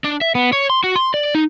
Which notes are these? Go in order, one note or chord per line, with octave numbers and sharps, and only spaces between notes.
D4
E5
B3
C#5
C6
F#4
C6
D5
D#4